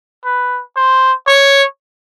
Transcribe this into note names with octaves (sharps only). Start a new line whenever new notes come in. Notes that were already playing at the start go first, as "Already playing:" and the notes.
B4
C5
C#5